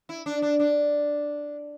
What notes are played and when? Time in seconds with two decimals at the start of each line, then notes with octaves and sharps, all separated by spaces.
0.09 E4
0.26 D4
0.42 D4
0.59 D4